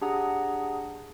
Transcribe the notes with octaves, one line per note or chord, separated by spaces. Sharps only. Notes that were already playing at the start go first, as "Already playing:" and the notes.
D4 G4 G#4 F#5 A#5 D#6